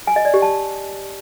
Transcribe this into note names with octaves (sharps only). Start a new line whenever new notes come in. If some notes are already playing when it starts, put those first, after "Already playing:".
G#5
D#5
D5
G4
A5